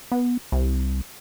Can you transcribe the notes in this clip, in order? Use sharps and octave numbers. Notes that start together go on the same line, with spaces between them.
B3
C2